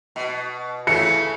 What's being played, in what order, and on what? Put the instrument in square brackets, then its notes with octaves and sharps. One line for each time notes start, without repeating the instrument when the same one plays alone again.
[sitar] B2
[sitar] C#3 E3 A3 [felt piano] C#7